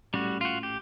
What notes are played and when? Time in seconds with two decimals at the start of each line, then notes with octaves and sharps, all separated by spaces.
0.14 A#1 A2 G3 C#4 F#4
0.41 F4 F#4
0.63 G4